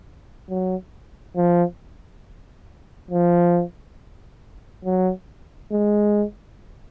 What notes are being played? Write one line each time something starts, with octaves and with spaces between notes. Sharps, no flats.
F#3
F3
F3
F#3
G#3